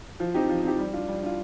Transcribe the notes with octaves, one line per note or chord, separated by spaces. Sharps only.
F3
C4 D#4 G4
F3
C4 D#4 G4
G3
D4 F4
G3
D4 F4